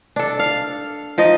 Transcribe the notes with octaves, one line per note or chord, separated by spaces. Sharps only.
D4 A4
F5
F3 D#4 D#5